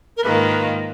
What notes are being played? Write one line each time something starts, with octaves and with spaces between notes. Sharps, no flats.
A#4
G#2 D#3 A#3 F4 B4